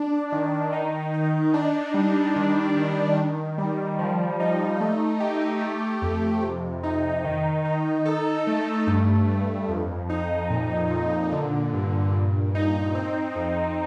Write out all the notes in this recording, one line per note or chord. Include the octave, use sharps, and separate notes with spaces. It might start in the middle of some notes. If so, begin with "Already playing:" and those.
Already playing: D4
D#3
D#4
D#4
D4
G3
D#3
D#3
D#3
G3
F3
D#4
A3
G4
A3
F2
C3
D#4
D#3
D#4
A4
A3
G2
G2
F2
D#4
A#2
A#2
D3
G2
A#2
D#4
C4
F2